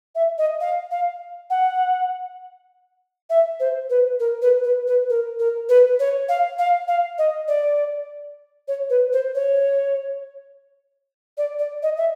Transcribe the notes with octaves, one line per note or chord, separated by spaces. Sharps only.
E5
D#5
F5
F5
F#5
E5
C5
B4
A#4
B4
B4
B4
A#4
A#4
B4
C#5
F5
F5
F5
D#5
D5
C#5
B4
C5
C#5
D5
D5
D#5
E5